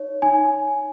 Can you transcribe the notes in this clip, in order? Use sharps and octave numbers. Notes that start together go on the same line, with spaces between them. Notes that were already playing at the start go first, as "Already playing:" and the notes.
Already playing: D#4 C#5
D#4 G#5